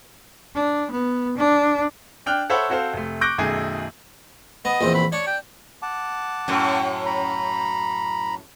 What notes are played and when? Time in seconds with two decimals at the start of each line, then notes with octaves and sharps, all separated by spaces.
0.55 D4
0.91 B3
1.37 D4
2.26 D4 G5 F6 F#6
2.50 A4 C5 C#5 E5 F#5 B5
2.69 C4 F#4 A4 C5 F5
2.93 F1 A3
3.21 C#6 D6 F#6 G6 A#6 D7
3.38 B1 F#2 D#3 A3 G#4 G#5
4.65 B3 D#5
4.81 A#1 E2 C4
4.94 B5
5.12 D4 C#5
5.27 G5
5.82 F#5 A5 D6
6.48 F#2 A2
7.06 A#5 B5